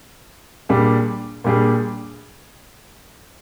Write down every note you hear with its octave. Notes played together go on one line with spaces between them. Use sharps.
A#2 G3 D4 G#4
A#2 G3 D4 G#4